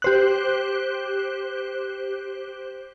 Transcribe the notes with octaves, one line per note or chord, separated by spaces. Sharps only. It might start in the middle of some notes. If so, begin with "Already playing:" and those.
G4 C5 F#6